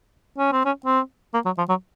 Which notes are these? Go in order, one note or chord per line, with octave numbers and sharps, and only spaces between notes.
C#4
C4
C#4
C4
A#3
F#3
F3
F#3